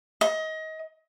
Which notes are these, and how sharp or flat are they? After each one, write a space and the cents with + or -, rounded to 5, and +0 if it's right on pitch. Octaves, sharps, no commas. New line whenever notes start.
D#5 +25